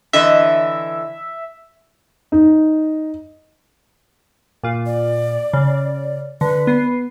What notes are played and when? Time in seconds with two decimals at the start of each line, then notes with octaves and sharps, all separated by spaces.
0.13 D3 E3 D#5 E5
2.32 D#4
4.63 A#2 F4
4.86 D5
5.54 C#3
6.41 D3 B4
6.67 B3 C7